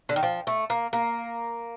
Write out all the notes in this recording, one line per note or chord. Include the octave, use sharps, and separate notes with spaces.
D3
D#3
F3
A3
A#3
A#3